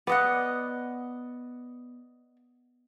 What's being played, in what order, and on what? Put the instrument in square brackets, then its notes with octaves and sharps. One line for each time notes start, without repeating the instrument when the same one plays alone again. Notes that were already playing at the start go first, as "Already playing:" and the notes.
[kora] B3 [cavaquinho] D5 D#5 F#5